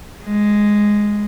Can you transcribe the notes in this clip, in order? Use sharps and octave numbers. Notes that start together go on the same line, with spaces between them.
G#3